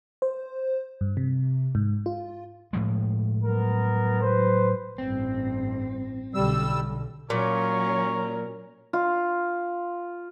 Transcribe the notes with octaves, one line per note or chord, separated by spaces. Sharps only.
C5
G2
C3
G#2
F4
A2 F3 G#3
F#3 B3 A#4
F#3 B4 C5
A1 G2 C4
B1 D3 G3 E6
A#2 F#3 C#4 A#4 C#6
F4